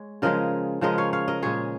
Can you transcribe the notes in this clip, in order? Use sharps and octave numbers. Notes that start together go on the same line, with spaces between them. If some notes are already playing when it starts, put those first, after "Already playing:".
Already playing: G#3 C#5
C#3 F3 G#3 A#4 D#5
C#3 F3 G#3 A#4 D#5
C#5 F5
C#5 F5
A#4 D#5
A#2 G#3 G#4 C#5